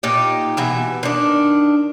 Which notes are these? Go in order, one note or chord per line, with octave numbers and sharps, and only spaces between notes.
A#2 D#4 G4
B2 E3 E5
D#3 D4